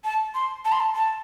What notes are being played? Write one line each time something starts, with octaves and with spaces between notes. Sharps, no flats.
A5
C6
A5
C6
A5
A5